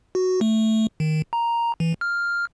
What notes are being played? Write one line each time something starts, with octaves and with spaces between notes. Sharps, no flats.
F#4
A3
D#3
A#5
E3
F6